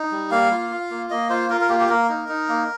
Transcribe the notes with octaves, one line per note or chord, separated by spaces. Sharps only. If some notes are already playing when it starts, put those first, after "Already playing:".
Already playing: D#4
G3
A#3 F5
F4
F4
A#3
A#3 D#5
F4 C5
F4 A#4
A#4
A#3 G4
G4
A#3 A#4
D#4
D#4
A#3